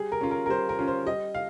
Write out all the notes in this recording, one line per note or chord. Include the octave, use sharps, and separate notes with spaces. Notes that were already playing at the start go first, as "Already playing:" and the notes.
Already playing: G3 G#4
A#4
C#4 F4
A#4
A#4
G3 C5
A#4
C#4 F4
C5
G3 D#5
F5